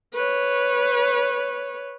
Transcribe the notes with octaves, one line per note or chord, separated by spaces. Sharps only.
B4 C#5